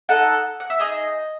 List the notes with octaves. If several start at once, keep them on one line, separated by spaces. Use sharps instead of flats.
D#4 A4 F#5
F#5
E5
D#4 G#4 D#5